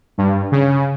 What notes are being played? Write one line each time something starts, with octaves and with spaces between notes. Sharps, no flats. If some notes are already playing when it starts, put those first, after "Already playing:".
G2
C#3